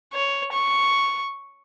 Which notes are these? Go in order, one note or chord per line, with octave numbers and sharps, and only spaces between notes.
C#5
C#6